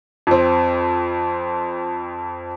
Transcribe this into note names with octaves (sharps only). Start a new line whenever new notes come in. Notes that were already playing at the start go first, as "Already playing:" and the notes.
F2 C4